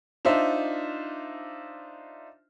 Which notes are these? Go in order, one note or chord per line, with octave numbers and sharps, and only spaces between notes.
D4 D#4 F4 C5 E5